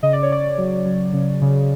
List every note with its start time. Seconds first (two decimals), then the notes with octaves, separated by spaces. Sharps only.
0.03 C#3 D#5
0.13 D5
0.23 C#5
0.30 C#3 D5
0.58 F#3
0.86 F#3
1.13 C#3
1.42 C#3